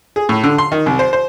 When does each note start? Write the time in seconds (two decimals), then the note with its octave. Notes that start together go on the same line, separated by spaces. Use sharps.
0.16 G#4
0.29 A2
0.44 D3
0.58 C6
0.72 D#3
0.86 C2
0.99 C5
1.13 C5